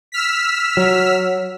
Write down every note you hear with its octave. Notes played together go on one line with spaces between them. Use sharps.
E6 F6 B6
F#3